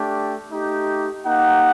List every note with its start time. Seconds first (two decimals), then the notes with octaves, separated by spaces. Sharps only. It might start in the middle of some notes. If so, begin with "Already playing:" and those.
Already playing: A3 D4 G4
0.52 A3 D#4 G4
1.24 A#3 D#4 G4 F#5